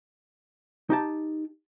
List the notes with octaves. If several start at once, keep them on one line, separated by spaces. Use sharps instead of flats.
D#4 G4 A5